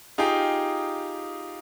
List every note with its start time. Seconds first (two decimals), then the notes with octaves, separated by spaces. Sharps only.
0.18 D#4 F4 G4 G#4 F5 G5